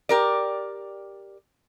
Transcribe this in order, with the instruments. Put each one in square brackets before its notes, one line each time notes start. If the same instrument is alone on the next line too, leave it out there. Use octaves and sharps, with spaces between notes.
[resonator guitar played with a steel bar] G4 A#4 D5